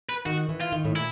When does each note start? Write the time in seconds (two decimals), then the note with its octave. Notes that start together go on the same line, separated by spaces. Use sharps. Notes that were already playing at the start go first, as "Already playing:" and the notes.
0.09 B4
0.26 D#3 F#4
0.49 E3
0.61 F4
0.72 D#3
0.85 A2
0.95 A#2 E4